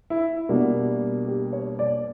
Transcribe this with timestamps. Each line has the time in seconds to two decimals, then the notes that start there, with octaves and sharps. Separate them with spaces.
0.10 E4
0.49 B2 G3 A#3 D4 F#4
1.27 G4
1.53 C#5
1.79 D5